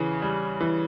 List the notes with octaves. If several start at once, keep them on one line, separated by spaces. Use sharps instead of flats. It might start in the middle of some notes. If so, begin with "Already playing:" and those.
Already playing: C#3 E3 G#4
G3
E3